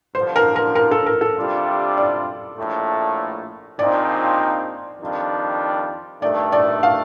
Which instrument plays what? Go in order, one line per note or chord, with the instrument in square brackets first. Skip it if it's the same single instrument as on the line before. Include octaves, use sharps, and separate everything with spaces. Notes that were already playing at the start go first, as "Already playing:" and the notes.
[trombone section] G2 D3 F3 [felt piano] C5
[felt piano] A#4
A#4
A#4
A4
A#4
A4
[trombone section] C3 G3 D4 F4
[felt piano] D5
[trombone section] A#1 A2 A3
[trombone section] A#1 A#2 F3 C4 D#4 [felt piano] D5
[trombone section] F2 D#3 G3 D4 F4
[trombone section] G2 D#3 A3 [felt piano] D5
[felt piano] D5
F5